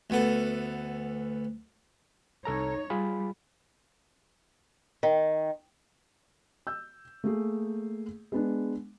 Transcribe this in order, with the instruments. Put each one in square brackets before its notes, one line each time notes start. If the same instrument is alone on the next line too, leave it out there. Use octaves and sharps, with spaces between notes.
[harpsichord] D2 B3 A4
[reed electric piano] C2 A4 A#5 [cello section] D#4 C#5
[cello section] G3 [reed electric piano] F4 G#4 B5
[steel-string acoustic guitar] D#3
[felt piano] E6 G6
A3 A#3 G#4
G#3 B3 D4